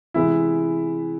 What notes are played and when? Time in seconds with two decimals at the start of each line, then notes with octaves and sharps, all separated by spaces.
0.14 C3 E3 G#3 B3 E4 E5